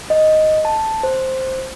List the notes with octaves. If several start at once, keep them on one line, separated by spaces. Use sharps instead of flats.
D#5
A5
C5